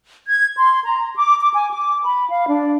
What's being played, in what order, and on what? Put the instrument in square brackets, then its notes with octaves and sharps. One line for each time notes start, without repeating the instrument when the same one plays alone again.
[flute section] G#6
C6
A#5
D6
D6
G#5
D6
B5
F5
D4